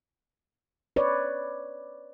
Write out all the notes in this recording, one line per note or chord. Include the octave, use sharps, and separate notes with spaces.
B4 C#5 D5